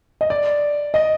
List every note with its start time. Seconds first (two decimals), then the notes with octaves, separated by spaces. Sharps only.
0.21 D#5
0.30 D5
0.94 D#5